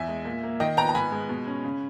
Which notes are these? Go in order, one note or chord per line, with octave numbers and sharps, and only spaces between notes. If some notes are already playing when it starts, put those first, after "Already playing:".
Already playing: E2 E5 G#5
G#3
A#2
A#3
D#3 D#5 G5
B3 G5 A#5
A#5
G#2 G#5 B5
G#3
B2
C#4
C#3